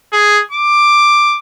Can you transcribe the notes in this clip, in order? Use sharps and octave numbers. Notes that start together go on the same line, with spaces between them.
G#4
D6